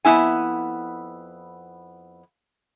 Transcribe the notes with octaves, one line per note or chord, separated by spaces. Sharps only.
F2 D#3 B3 E4 G#5